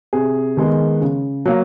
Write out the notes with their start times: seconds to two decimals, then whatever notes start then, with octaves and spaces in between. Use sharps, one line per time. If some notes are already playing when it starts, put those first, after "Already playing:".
0.13 C3 G#4
0.57 D#3 G#3 B3
1.01 C#3
1.45 F#3 A#3